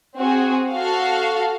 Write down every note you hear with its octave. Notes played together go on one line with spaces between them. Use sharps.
C4 F#4 G#4
F#4 A4 F5